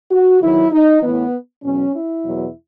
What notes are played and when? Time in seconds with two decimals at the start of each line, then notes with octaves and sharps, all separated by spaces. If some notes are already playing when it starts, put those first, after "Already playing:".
0.11 F#4
0.41 E2 D#3 F#3 E4
0.72 D#4
1.03 A2 E3 B3
1.63 E2 B2 F#3 C#4
1.94 E4
2.24 E2 B2 F#3